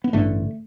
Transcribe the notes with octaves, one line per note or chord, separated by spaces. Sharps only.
B3
A1 G2 D3 A3